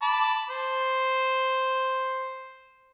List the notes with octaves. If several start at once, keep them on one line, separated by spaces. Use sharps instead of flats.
A5 B5 D6
C5